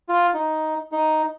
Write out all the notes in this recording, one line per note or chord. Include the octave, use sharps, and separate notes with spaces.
F4
D#4
D#4